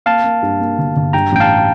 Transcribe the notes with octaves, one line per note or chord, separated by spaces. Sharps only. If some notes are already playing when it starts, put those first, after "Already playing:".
A#3 F5 A5
A#3
G2
A#3
G1
G1
G2 G5 A#5
A1 G5
F5 A5